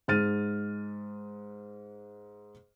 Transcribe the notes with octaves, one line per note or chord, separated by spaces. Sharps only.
G#2 F6 A6 D#7